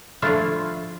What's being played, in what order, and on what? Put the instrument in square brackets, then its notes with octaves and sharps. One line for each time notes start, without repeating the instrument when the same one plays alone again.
[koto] F3 A3 D4 E4 F4